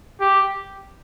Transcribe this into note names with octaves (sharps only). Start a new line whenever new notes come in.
G4